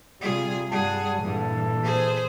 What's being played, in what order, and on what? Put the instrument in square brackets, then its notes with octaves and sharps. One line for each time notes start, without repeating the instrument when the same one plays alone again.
[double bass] C3 G3 [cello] F4 G#4
[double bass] G2 G3 [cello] G#4 [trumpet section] F#5 A5
[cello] G2 [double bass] A#2 E3 [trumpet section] A4
[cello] G#4 C5